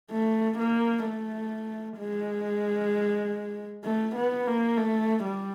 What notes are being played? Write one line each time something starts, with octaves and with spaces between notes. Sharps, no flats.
A3
A#3
A3
G#3
A3
B3
A#3
A3
G3